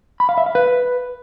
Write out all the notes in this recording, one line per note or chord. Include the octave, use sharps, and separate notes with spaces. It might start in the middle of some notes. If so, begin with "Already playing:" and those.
B5
F5
E5
F5
B4